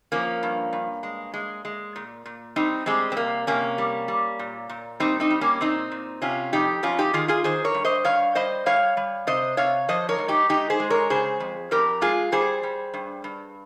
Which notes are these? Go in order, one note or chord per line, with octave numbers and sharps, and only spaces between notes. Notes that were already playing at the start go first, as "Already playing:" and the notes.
F3 A#3 C#4
G2
G2
G#3
G#3
G#3
A#2
A#2
G3 C4 D#4
G3 G#3 C4
C4
C3 A#3
C3 A#3 C#4
G3
G3
A#2
A#2
G3 C4 D#4
C4 D#4
G3
A#3 C#4
A#2 C4 D#4
A#2
C3 C#4 F4
F2 D#4 G4
F2 C#4 F4
D#4 G4
D#3 F4 G#4
F4 G#4
D#3 G#4 C5
A#4 C#5
G2
C5 D#5
G2 C#5 F5
G3 C5 D#5
G3 C#5 F5
G3
C3 C5 D#5
C3 C#5 F5
F3 C5 D#5
A#4 C#5
G#2
D#4 G4
G#2 D#4 G4
G#4 C5
G#3
A#4 C#5
C#3 G#4 C5
F2
F2 G4 A#4
G#3 F4 G#4
G3 G#4 C5
G3
G2
G2